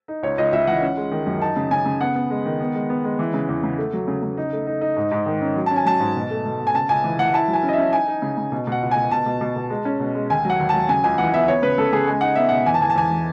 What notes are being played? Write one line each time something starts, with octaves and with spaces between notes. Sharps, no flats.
D#4
C#2 C#5
C#2 D#5
C#2 E5
E3 F#5
C#4
G#3
D#3
F#2
D#4 A5
C#3
C#3 G#5
C#3
B3 F#5
B3
G#3
D#3
B3
G#3
B3
G#3
E3
C#3
E2
C#3
A3
F#3
C#3
C#3
D#4
A3
D#4
D#4
G#2
G#2
D#3
C#4
F#3
C#4 A5
G#5
F#3 A5
G#2
B2
A3
B2
B2
G#5
C#3 A5
C#2 G#5
E3
E3 F#5
E4 A5
F#3
G#5
C#4
D#5
E5
C#4
D#4 G#5
D#4
C#3
C#3
B2
B2 F#5
C#2
G#5
B2
B2 A5
B2
B2
B2
G#3
C#4
B2
G#3
D#2 G#5
F#3 F#5
D#2
F#3 A5
C#3 G#5
C#2 G#5
E3 F#5
B3 E5
B3 C#5
C#3 B4
C#3 A4
C#3 G#4
G#3 G#5
D#4 F#5
B3 E5
B2 F#5
E2 G#5
A5
E2 G#5
A5
E2 G#5
E3